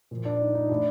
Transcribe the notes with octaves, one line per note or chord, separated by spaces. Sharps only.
A#2 F3
D4
D#4
D#4
A2 E3 D4